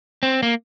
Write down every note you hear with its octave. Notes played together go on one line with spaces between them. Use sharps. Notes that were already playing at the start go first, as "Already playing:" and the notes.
C4
A#3